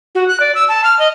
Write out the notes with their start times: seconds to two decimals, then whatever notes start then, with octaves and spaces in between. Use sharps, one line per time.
0.15 F#4
0.28 F#6
0.40 D5
0.55 E6
0.69 A5
0.84 F6
0.99 D#5